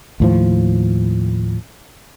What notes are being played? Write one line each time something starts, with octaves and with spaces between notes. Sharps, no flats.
D#2 A2 F3